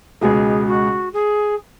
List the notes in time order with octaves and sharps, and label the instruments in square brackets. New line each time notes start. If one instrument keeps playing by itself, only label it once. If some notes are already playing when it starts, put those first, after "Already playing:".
[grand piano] C#2 B2 G#3 [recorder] G#4
[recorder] F#4
G#4